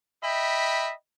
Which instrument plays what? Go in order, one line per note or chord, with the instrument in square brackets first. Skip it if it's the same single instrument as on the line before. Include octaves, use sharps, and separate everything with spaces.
[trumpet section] D#5 E5 G5 B5